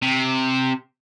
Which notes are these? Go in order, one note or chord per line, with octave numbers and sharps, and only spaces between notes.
C3